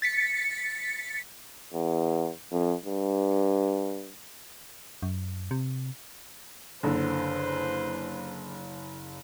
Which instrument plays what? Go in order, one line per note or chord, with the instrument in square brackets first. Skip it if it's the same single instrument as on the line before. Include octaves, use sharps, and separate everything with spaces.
[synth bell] A6 B6 C#7
[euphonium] E2
F2
G2
[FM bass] F#2
C3
[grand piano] F#1 [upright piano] D3 [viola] B4 C5